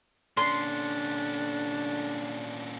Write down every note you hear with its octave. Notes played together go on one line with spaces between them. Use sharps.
A#2 D3 C#4 D4 C6